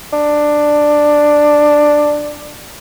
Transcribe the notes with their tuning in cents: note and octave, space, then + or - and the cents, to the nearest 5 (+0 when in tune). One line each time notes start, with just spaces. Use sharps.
D4 +10